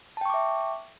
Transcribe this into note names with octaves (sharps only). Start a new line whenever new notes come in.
E5 G5 A5 C#6 D6